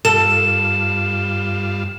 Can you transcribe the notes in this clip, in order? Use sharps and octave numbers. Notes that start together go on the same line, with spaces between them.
G2 F4 A4 E7